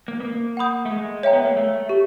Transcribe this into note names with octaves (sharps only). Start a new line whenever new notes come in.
A#3
B3
A#3
F#5 B5 D#6 G6
A3
G#3
C#5 E5 G5 A#5
B3
A#3
A3
G4